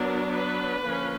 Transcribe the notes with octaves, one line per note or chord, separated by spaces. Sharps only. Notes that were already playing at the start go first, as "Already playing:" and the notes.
Already playing: F#3 B3 D4 A#4
B4
D3 F3 A#3 C#4